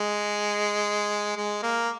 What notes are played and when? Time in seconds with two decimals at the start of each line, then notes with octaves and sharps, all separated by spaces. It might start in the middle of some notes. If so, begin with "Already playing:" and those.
Already playing: G#3
1.37 G#3
1.63 A#3